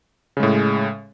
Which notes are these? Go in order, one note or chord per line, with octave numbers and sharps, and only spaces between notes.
A2 C#3 G#3